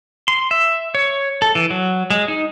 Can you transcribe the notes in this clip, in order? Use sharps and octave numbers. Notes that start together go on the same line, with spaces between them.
C6
E5
C#5
A4
E3
F#3
G#3
D#4